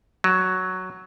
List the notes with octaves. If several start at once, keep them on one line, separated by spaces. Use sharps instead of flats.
F#3